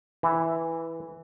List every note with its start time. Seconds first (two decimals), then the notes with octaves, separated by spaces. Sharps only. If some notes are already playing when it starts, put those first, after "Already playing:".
0.23 E3